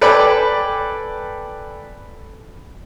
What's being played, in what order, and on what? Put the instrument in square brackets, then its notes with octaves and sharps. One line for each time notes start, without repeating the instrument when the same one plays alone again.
[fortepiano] A4 B4 D5 G5 G#5 B5